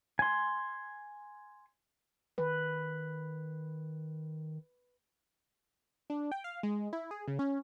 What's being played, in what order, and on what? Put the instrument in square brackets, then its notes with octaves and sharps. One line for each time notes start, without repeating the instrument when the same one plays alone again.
[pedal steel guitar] G#5 C6
[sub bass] D#3 [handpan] B4
[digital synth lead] D4
G5
F5
G#3
E4
G#4
C#3
C#4